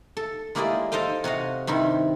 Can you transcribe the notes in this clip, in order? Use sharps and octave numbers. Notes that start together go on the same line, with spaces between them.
A4
G#3 A#3 E4 G4 G#4 D5
A4 C5 D#5 F5 G5
C3 F#4 D#5 F5
G2 C3 D#3 E4